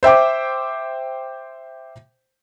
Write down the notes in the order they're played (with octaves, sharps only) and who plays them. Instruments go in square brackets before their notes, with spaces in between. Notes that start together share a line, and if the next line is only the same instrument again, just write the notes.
[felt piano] C5 E5 G5 D6